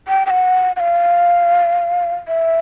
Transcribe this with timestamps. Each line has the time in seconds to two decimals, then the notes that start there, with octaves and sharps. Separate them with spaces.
0.08 G5
0.26 G5
0.30 F#5
0.76 F#5
0.80 F5
2.28 E5